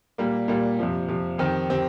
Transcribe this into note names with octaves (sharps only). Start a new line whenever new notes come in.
A#2 G3 A#3
A#2 G3 A#3
F2 C3 F3
F2 C3 F3
F2 D#3 C4 G4
D#3 C4 G4